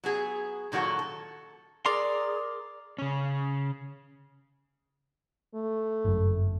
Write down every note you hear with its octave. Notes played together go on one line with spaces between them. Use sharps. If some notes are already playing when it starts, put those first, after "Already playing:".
F#3 B3 G#4
A#2 D#3 F#3 F#4 A4
A4
G#4 A#4 D5 A#5 C6
C#3 C#4
A3
G1 F#2